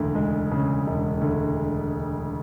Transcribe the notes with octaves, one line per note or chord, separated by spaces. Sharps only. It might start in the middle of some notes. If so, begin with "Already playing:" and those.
Already playing: E1 D2 C#3
G#3
C#3
E1
D2